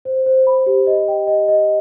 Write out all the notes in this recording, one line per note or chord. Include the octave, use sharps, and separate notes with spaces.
C5
C5
B5
G4
D#5
G5
D#5
D#5